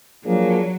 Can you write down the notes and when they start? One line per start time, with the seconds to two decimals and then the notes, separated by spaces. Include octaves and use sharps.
0.24 F3 F#3 A#3 D4 G#4